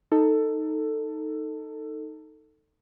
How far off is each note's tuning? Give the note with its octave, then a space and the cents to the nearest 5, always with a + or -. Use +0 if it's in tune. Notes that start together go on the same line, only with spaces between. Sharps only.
D#4 +0 A4 +10